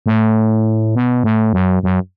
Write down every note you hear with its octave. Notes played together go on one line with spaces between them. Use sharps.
A2
B2
A2
F#2
F#2